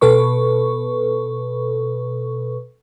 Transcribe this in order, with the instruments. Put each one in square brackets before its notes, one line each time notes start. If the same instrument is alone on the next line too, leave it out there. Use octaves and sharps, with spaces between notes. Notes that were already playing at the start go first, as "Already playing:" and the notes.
[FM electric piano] B2 A4 B4 C#6